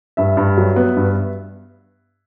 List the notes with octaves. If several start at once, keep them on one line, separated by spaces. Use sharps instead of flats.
G2 E5
G2
F#3
B3
G2